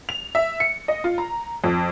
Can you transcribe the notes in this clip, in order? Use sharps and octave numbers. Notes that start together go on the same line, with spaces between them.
F7
E5
C#7
D#5
F4
A#5
F2